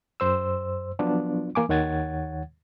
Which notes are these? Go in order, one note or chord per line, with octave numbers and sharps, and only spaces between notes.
F#2 C5 E6
F3 F#3 B3 D4 F4
E3 A#3 G#5 D6
D#2 D#3 C#5 F#5 G#6 A6